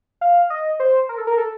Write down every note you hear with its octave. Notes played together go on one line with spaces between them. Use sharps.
F5
D#5
C5
A#4
A4
A#4
A4